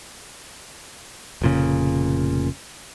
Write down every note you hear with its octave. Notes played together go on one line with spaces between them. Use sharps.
F1 A#2 C#3